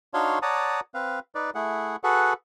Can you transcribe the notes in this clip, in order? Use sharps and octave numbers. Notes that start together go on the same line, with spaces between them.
D4 D#4 F#4 C#5 F5 C6
C#5 D5 F#5 A5 A#5 D#6
C4 B4 F5
D#4 B4 D5
A3 E4 G#4 F#5
F#4 G#4 A4 B4 F#5